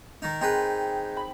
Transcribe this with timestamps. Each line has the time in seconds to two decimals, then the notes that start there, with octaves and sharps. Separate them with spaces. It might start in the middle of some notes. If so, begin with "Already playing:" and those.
0.22 D#3 D#4
0.41 D#3 C4 D#4 G#4 B4 G5
1.17 B5